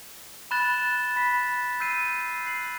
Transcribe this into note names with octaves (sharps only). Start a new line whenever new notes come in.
B5 F#6 A6 E7 G7
B5 F#6 B6
E6 G6 C7 D#7
F#6 C7 F#7